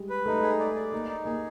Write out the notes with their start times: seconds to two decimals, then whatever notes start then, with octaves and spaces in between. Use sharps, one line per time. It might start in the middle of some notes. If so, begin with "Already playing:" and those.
Already playing: G3 G#3
0.10 B4
0.26 A3 D#4
0.43 G#4
0.59 D5
0.75 D5
0.92 A#3 D#4
1.09 D#4
1.25 A#3 G#4